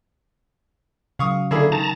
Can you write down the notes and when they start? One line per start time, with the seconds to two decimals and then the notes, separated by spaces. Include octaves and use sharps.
1.19 C#3 F#3 F5 C#6 D#6
1.51 D3 A#3 E4 G#4
1.72 D#3 A5 A#5